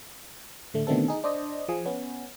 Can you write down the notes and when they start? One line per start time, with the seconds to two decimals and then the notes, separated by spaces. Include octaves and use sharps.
0.74 A2 D3 A3
0.87 B2 D3 D#3 A3 C4 A4
1.08 D#4 G#4
1.24 D4 C5 D5 D#5
1.69 F3 G#4
1.86 B3 C#4